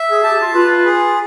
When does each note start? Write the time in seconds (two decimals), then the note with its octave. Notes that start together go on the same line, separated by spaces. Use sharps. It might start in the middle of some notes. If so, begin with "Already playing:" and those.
Already playing: E5
0.09 G#4
0.23 G4 A5
0.39 F4
0.54 F4 B4
0.85 G#4